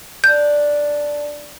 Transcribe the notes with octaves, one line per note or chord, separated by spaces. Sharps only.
D4 G6